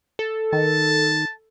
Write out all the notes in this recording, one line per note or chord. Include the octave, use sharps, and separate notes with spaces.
A4
D#3 A5